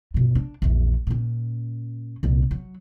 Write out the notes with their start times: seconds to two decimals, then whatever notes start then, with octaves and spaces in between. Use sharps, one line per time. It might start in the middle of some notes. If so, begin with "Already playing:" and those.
0.14 G2 B2
0.35 D4
0.62 A#1 E2
1.07 A#2 C#4
2.23 C2 A#2
2.51 F#3